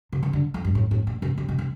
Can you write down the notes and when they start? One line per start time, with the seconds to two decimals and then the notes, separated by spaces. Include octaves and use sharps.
0.12 C3
0.23 C#3
0.33 D3
0.54 F2
0.65 G2
0.75 A2
0.91 A2
1.07 A#2
1.22 C3
1.38 C3
1.48 B2
1.59 C3